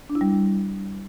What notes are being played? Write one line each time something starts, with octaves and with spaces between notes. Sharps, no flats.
D4
E4
G3